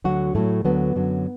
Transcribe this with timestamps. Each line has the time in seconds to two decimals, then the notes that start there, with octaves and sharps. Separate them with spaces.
0.04 D2 D3 F#3 F#4
0.35 A2 F#3 A3
0.65 D2 D3 F#3 B3
0.95 F#2 D3 F#3